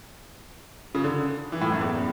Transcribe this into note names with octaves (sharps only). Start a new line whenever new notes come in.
C#3
D3
E3
A2
F#2
E2